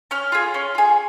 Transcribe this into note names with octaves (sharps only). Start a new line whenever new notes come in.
C#4 F6
F4 G#4
C#4
F4 G#4